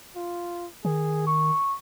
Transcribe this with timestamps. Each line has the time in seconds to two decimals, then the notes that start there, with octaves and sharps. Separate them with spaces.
0.16 F4
0.85 D#3 G#4
1.26 C#6